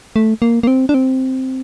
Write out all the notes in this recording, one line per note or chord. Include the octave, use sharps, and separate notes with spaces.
A3
A#3
A#3
C4
D4
C4